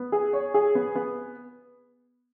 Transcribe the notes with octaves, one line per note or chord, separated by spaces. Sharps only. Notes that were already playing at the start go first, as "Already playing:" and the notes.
Already playing: B3
G#4
C#5
G#4
B3
B3